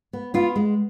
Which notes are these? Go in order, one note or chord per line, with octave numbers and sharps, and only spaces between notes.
B3
B3 F4
G#3